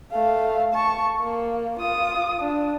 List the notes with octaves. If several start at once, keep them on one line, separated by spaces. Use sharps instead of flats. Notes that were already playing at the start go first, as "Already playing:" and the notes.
A3 F5
A5 C#6
A#3
F4 D#6
D4